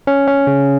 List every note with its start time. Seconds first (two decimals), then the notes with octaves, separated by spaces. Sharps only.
0.07 C#4
0.27 C#4
0.47 C#3